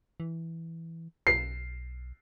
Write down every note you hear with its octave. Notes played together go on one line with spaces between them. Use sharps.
E3
B1 C7